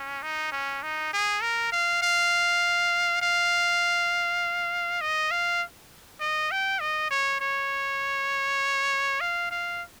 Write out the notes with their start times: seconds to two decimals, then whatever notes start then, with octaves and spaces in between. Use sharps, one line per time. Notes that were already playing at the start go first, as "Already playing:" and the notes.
Already playing: C#4
0.22 D#4
0.52 C#4
0.83 D#4
1.13 G#4
1.42 A#4
1.72 F5
2.02 F5
3.21 F5
5.01 D#5
5.31 F5
6.20 D#5
6.51 G5
6.80 D#5
7.10 C#5
7.40 C#5
9.21 F5
9.51 F5